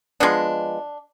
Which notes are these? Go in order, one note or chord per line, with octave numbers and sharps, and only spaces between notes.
F3 G#3 B3 D4